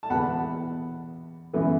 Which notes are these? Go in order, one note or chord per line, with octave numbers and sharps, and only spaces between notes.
A5
E2 B2 B3 F#5 B5
F#2 E3 B3